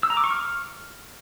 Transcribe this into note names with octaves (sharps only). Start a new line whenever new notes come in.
E6
A#5
D6
C#6
F6